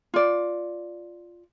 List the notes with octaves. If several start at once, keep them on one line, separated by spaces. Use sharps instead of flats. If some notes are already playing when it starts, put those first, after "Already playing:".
F4 D5